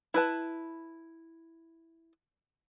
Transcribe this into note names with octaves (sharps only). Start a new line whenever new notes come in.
E4 B4 A5